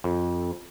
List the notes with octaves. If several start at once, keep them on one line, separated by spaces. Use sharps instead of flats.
F2